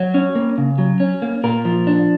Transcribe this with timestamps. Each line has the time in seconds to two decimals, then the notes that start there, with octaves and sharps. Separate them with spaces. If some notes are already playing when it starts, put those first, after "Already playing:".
Already playing: F#3
0.14 C#4
0.35 A#3
0.58 C#3
0.78 F#3
1.00 C#4
1.22 A#3
1.44 A#2 A#4
1.65 F3
1.87 D4